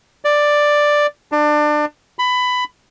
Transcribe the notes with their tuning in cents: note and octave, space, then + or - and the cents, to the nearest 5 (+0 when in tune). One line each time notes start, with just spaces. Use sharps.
D5 +5
D4 +25
B5 +15